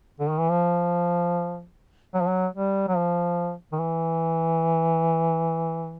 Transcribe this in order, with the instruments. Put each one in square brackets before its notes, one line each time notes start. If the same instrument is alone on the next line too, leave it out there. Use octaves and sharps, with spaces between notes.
[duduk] D3
D#3
E3
F3
F#3
F3
F#3
G3
F#3
F3
D#3
E3